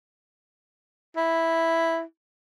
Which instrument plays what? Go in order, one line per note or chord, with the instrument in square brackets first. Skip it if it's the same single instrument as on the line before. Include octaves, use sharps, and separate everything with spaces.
[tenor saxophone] E4